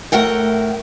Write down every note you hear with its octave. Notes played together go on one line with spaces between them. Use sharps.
A2 A3 A#4 F#5 G5